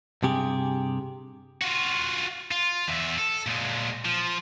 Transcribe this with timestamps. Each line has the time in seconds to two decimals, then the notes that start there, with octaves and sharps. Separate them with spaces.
0.23 G2 C3 G4 G#4
1.62 F4 F#4
2.51 F4
2.88 E2 E4
3.18 A4
3.47 A#2 G#3
4.05 F3